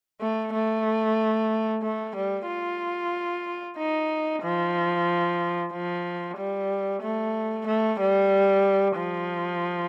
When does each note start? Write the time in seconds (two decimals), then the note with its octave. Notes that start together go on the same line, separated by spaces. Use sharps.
0.21 A3
0.53 A3
1.83 A3
2.15 G3
2.48 F4
3.77 D#4
4.43 F3
5.73 F3
6.37 G3
7.02 A3
7.67 A3
8.00 G3
8.97 F3